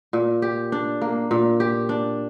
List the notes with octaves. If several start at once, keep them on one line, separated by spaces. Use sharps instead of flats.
A#2
G4
D4
A#3
A#2
G4
D4